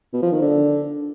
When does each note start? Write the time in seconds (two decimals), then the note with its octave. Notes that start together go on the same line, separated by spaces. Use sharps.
0.13 B2
0.23 F3
0.32 D#3
0.42 D3